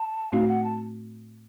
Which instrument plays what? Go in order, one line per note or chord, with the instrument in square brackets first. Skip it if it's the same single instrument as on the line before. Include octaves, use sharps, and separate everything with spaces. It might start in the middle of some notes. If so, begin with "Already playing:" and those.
Already playing: [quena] A5
[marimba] A2 A3 C4 D#4 F#4 [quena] F5
[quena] F#5
A5